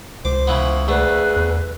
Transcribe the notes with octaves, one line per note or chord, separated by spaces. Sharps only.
C#2 C5 D6
C#3 E3 B3
D2 A3 G#4 B4
E2